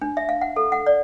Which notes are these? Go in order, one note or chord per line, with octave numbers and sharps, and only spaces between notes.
D4
E5
F5
F#5
A4
F#5
D5